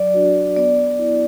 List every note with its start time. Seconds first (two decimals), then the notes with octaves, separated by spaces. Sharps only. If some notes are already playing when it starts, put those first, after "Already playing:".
Already playing: F#3 D5
0.14 D4 F#4
0.56 B3 D5
0.99 E4